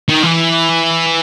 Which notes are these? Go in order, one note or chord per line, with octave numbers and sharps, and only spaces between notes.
D#3
E3